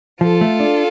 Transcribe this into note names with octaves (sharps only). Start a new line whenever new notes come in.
F3 F4 A4
A3
D4